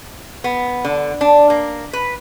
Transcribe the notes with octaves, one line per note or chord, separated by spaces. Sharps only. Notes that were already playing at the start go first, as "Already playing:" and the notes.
B3
D3
D4
A#3
B4